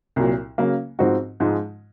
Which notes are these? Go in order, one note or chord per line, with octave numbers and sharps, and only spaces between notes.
C2 A#2 F#3
C#3 F#3 A#3
G#2 F3 C4 D#4 F#4
G#2 F3 G#3 D#4